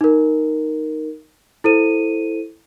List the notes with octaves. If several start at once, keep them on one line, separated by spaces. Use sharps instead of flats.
D#4 A#4
E4 A4 C5 D#7